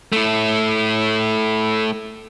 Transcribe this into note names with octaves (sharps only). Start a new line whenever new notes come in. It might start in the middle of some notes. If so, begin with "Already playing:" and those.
A3 E4